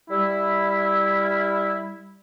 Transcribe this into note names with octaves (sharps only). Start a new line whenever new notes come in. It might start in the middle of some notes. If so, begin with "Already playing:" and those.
G3 E4